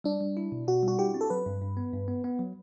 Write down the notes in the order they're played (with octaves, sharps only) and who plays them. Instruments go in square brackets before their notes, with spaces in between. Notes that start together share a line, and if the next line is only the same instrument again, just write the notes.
[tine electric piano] G3 [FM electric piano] D4
[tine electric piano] G3
E4
B2
[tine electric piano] B2 [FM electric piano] F#4
[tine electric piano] G3
[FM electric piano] F#4
[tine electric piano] E4 [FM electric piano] G4
[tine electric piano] C4
[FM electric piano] A4
[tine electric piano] F#3 [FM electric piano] B4
[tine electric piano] G2
G2
B3
G2
B3
B3
F#3